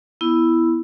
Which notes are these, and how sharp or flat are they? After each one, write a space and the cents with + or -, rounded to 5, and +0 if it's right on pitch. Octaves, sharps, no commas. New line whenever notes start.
B3 +0 E4 +0